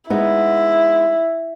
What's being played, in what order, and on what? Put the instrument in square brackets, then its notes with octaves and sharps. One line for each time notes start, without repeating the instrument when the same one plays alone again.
[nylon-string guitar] G#3 B3 D#4 [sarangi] E4